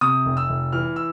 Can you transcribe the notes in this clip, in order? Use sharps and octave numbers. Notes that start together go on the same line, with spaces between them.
C3 D#6
F1
E6
F1
E3 F6
E6